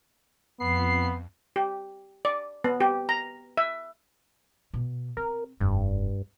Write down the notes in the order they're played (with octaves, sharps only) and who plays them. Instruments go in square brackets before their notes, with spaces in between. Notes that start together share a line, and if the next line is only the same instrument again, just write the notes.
[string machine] F2 [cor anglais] B3 [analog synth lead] C7
[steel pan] G4
D5
B3
G4
A#5
E5
[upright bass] B2
[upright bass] C4 [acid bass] A#4
[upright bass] F1 [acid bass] G2